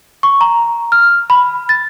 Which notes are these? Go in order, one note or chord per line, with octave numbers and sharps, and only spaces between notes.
C#6
A#5
F6
B5
A6